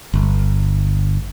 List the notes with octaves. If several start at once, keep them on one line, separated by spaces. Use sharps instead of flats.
G1